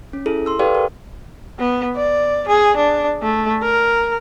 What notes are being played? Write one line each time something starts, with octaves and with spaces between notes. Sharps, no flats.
C#4
E4 G#4 A4
C6 E6
G4 A4 B4 D5 F5 G5
A#4
B3
D5
G#4
D4
A3
A#4